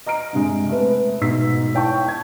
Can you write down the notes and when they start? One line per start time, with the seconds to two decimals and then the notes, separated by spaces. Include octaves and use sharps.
0.06 D#5 A#5 F6 D7
0.33 G2 C3 G#3
0.69 A3 B3 B4
1.21 G#2 B2 D#4 E6 B6
1.74 E4 C#5 G5 A5 C#6
2.05 A5 G#6